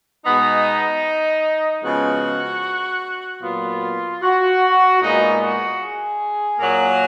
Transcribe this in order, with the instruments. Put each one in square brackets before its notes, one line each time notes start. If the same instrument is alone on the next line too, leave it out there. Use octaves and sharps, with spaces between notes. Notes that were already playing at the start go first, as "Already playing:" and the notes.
[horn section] B2 G#3 B3 D#4
C#3 F3 G#3 B3 F#4
A#2 F#3 B3 F4
F#4
A#2 G#3 B3 D#4
F#4
G#4
A#2 F#3 A#3